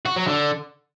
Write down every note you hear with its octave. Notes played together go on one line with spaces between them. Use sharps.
F#4
F#3
D3